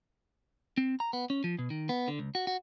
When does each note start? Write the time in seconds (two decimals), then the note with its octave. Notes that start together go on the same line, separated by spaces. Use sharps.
0.78 C4
1.00 A#5
1.13 B3
1.30 C#4
1.44 F3
1.59 B2
1.70 D#3
1.89 B3
2.08 D3
2.19 C#2
2.35 F#4
2.47 F#4